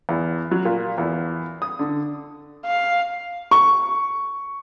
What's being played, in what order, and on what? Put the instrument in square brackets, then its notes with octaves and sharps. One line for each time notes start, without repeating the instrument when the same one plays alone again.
[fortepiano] E2
F#3
A#2
E2
D#6
D3
[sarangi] F5
[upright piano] C#6